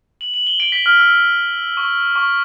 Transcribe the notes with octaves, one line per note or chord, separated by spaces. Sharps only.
F#7
F#7
G7
D7
B6
F6
E6
C#6
C#6